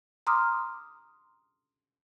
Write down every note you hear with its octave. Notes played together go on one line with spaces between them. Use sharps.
A#5 C6 D6 D#6 F6